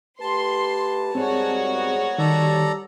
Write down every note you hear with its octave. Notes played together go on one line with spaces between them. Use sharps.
A3 G4 B4 A5 C6
G#2 G3 C4 F#4 G#4 A#4 C#5
B3
D#3 G3 A4 D5 A#5